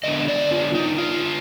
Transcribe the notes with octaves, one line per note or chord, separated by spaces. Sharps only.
D3 G#3 B3 D4 D#5
D5
F4
D#4
F4